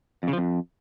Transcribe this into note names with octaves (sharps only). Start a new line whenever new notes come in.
F2
C#3
F3
F2